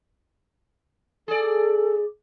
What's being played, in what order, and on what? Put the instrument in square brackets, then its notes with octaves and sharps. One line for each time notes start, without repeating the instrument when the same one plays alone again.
[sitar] G#4 D5 [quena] A4